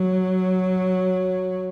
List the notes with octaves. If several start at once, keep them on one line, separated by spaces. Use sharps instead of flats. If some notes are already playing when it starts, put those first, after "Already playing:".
Already playing: F#3